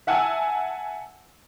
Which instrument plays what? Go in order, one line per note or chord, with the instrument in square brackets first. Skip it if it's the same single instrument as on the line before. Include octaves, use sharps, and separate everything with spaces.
[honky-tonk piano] E5 F#5 G#5 A5 E6